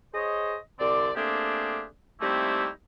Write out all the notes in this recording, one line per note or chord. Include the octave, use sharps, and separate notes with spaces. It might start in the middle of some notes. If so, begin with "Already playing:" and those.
G#4 C5 C#5 D#5
C2 D3 C4 D5
A3 A#3 C4 D4 G4 G#4
G3 A3 A#3 C4 D#4 E4